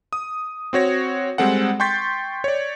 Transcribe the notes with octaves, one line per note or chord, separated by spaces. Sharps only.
D#6
C4 F#4 C#5 A#6
G3 G#3 C4 A4 F#5
G5 C6 C#6 G6 A6 B6
C#5 D5